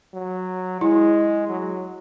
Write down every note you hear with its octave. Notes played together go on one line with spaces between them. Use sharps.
F#3
G#3 E4
F#3